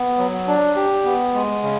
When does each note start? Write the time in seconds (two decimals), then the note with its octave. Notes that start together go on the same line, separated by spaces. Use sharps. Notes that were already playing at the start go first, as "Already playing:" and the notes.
Already playing: B3
0.18 F#3
0.48 D4
0.76 G4
1.05 B3
1.34 G#3
1.63 C#3